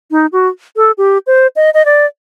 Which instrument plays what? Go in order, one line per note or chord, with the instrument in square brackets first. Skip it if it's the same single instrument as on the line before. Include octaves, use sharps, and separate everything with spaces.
[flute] D#4
F#4
A4
G4
C5
D#5
D#5
D5